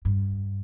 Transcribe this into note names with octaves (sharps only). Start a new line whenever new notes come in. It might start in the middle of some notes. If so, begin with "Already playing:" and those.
G2